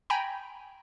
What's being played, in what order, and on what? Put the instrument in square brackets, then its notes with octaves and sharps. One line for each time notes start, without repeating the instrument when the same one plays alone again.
[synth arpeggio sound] G5 G#5 A#5 B5